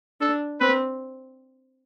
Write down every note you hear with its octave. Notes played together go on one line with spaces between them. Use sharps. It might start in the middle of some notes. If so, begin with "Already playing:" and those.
D4 A4
C4 B4